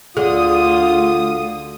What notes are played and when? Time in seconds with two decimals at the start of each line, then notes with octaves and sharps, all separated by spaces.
0.17 D2 D3 F4 G#4 D#6